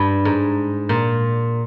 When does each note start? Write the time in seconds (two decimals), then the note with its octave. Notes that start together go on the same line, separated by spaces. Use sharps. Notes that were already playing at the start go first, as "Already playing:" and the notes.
Already playing: G2
0.25 G#2
0.89 A#2